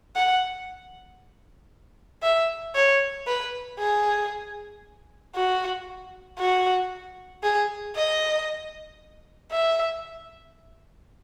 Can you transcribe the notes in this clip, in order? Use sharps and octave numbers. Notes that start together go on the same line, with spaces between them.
F#5
E5
C#5
B4
G#4
F#4
F#4
G#4
D#5
E5